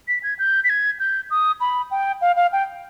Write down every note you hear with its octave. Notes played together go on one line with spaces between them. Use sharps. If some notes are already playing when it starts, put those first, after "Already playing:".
B6
G#6
G6
B6
G#6
G6
D#6
B5
G5
F5
F5
G5